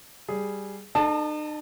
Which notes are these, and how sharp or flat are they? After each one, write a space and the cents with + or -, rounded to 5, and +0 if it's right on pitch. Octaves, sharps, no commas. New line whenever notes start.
G3 +0 G#4 +0
D#4 -45 A4 -5 A5 +0